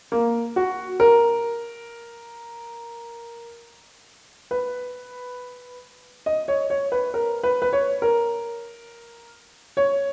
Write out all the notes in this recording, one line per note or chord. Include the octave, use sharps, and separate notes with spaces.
A#3
F#4
A#4
B4
D#5
C#5
C#5
B4
A#4
B4
B4
C#5
A#4
C#5